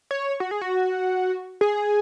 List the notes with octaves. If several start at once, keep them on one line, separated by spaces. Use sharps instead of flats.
C#5
F#4
G#4
F#4
G#4